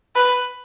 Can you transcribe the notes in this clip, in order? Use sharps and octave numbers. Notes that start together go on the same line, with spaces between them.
B4